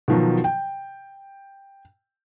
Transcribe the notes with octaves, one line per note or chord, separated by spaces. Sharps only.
B2 D#3 F3 F#3
G5